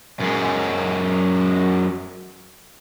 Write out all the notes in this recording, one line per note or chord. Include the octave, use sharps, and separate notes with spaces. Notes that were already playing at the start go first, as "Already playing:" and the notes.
F#2 G#3